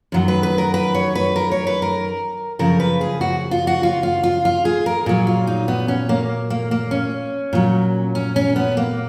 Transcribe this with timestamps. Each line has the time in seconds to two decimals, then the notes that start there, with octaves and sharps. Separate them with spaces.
0.12 F#2 D#3 F#3
0.28 B4
0.43 B4
0.58 A#4
0.74 B4
0.95 C#5
1.15 B4
1.36 A#4
1.52 C#5
1.67 B4
1.82 A#4
2.59 F#2 C#3 F3 A#4
2.80 B4
3.01 G#4
3.21 F#4
3.51 F4
3.67 F#4
3.83 F4
4.03 F4
4.23 F4
4.45 F4
4.65 G#4
4.86 A#4
5.06 A#2 F#3 G#4
5.27 F4
5.47 D#4
5.68 B3
5.88 C#4
6.09 A#3
6.50 A#3
6.71 A#3
6.91 C#4
7.53 A#2 F#3
8.15 C#4
8.36 C#4
8.56 B3
8.77 A#3